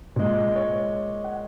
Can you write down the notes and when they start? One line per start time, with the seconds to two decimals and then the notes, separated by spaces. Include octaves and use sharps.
0.16 A#2 G#3
0.56 C#5
1.24 F#5